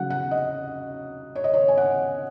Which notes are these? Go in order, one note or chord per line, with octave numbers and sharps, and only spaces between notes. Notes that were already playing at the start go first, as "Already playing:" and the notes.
Already playing: C#3 F#3 C#4 F#5
F#5
D#5
C#5
D#5
C#5
G#5
F#5